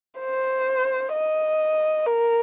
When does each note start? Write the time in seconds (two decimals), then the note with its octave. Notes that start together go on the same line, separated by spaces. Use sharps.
0.20 C5
1.13 D#5
2.07 A#4